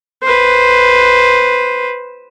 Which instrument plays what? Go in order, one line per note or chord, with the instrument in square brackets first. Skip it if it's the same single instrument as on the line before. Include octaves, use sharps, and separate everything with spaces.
[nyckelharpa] B4 C5